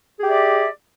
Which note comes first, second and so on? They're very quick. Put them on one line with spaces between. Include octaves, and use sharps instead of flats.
G#4 G4 E5 D5